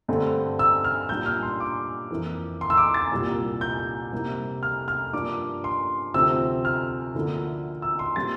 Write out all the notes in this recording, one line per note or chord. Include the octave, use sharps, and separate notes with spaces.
G2 D3 A3 C4
E6
F6
A#2 G3 D4 G6
F6
C6
D6
F2 E3 A#3 E4
C6
E6
D6
A6
C2 A#2 G3
G6
C3 G3 A#3 E4
F6
F6
G2 F3 A#3 D4 D6
C6
D2 C3 F3 C4 E6
F6
D2 D3 F3 A#3 E4
E6
C6
A#2 G3 C4 A6